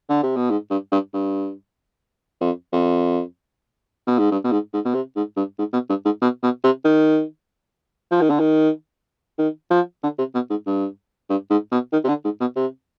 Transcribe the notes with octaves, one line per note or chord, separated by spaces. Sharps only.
D3
C3
B2
G#2
G2
G2
G2
F2
F2
B2
G#2
G2
B2
G#2
G#2
B2
C3
G#2
G2
G#2
B2
G2
G#2
B2
B2
C3
D#3
F3
D#3
D3
D#3
D#3
F3
D3
C3
B2
G#2
G2
G2
G#2
B2
D#3
C3
D3
G#2
B2
C3